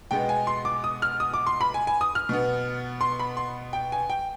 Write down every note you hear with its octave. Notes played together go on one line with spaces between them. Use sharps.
B2 G#3 B3 G5
G#5
C6
D6
D#6
F6
D#6
D6
C6
B5
G#5
G#5
D#6
F6
B2 B3
C6
B5
C6
G5
G#5
G5